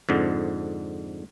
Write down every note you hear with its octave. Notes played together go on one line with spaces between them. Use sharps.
F2 G#2 D3